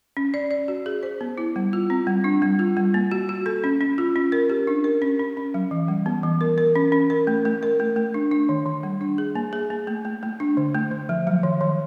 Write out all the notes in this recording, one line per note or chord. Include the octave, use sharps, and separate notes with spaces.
C#4
D5
D5
F#4
G#4
C5
B3
E4
G3
F4
C4
G3
D4
G3
F4
G3
A#3
F#4
F#4
A4
C#4
C#4
F4
C#4
A#4
G4
D4
A#4
C#4
C#4
C#4
F#3
E3
G3
B3
E3
A#4
A#4
C#4
C#4
A#4
A3
A3
A#4
A3
A3
D4
D4
D#3
D#3
G3
D4
G#4
A#3
G#4
A#3
A3
A3
A3
D4
D3
A3
D3
F3
F#3
D#3
D#3